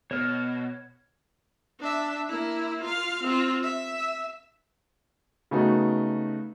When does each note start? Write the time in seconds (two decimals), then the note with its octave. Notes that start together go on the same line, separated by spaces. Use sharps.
0.11 B2 C#5 F6
1.80 D4 E5
2.29 A#3 E4
2.81 F4 F5
3.23 C4 F4
3.63 E5
5.51 C#3 A3 B3 D#4 F#4